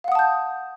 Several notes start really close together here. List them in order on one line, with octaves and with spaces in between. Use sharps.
F5 F#5 D#6 A5 G6